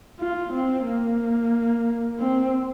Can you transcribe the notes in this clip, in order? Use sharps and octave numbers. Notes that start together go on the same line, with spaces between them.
F4
C4
A#3
C4